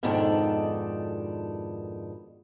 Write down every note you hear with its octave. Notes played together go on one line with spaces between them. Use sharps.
F2 G#2 B2 D#3 D4 A4